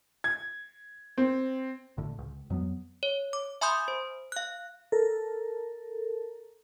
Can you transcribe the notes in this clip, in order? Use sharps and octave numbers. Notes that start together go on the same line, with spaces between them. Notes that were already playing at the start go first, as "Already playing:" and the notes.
G#6
C4
G#1 A2 D3
C#2
F2 F#3 G3 B3
C#5
D6
E5 G#5 B5 C6 D#6 G6
C5
F5 F#6
A4 A#4